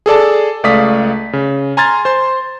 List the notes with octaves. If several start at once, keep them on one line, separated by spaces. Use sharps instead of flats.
G#4 A4 D5 A5
C#2 A3 D5 F5 D#6 B6
C#3
G#5 A#5 C6 F6 G#6 A6
C5 C6